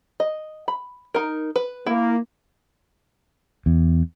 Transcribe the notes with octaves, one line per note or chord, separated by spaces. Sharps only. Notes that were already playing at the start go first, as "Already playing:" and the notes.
D#5
B5
D#4 A#4
B4
A#3 E4
E2